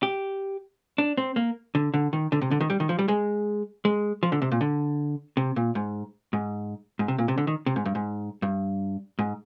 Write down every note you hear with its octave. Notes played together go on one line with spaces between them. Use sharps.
G4
D4
C4
A#3
D3
D3
D#3
D3
C3
D3
D#3
G3
D#3
F3
G3
G#3
G#3
F3
D3
C3
A#2
D3
C3
A#2
G#2
G#2
G#2
C3
A#2
C3
D3
D#3
C3
G#2
G2
G#2
G2
G#2